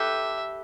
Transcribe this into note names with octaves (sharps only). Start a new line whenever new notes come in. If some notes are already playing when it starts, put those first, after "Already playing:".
Already playing: G4 A4 B4 E5